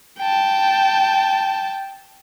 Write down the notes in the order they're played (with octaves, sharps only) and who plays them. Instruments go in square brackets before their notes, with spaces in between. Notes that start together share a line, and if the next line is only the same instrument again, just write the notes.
[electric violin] G5 A5